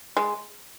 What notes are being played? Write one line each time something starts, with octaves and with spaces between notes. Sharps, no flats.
G#3